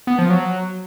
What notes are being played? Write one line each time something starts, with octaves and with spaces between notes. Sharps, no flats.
B3
F3
F#3